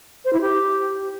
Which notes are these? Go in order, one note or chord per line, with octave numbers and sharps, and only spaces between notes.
C5
E4
G4